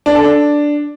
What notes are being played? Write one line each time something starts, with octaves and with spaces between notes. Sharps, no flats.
D4
A4
D4